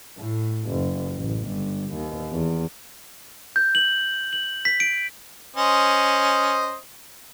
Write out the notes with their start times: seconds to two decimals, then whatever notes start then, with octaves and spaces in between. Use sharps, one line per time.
0.18 A2
0.69 F#1
1.16 A1
1.47 G1
1.93 D#2
2.32 E2
3.56 G6
3.75 F#7
4.33 F#7
4.65 B6
4.80 D7
5.56 C#4 C5 D#5